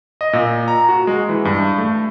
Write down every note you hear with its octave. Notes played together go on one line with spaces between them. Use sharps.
D#5
A#2
A#5
F#4
G#3
E3
G2
A3